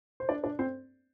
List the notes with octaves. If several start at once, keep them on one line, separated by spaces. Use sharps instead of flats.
C5
D4 D5
D4 D5
C4 C5